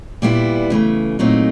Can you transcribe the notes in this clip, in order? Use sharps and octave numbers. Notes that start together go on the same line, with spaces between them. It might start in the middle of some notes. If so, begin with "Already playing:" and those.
A#2 G3 B3 E4
C#3 E3 A3
A#2 F#3 A3 C4 D#4